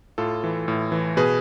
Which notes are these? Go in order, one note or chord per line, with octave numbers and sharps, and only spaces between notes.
A2 F4 A4
E3
A2
E3
B2 G#4 B4